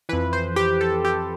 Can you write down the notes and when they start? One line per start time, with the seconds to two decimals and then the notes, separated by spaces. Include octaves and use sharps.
0.09 F2 E3 B4
0.33 C5
0.56 G4
0.81 A4
1.05 G4